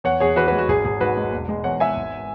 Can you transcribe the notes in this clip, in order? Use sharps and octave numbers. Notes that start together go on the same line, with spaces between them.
E2 C#5 F#5
E2 G#4 C#5
E3 F#4 B4
F#4 B4
G#3
F#4
G#1 G#4
G#1 G#4
G#2 F#4 B4
G#3
E1
G#3
E2 C#5 F#5
E3 E5 G#5
G#1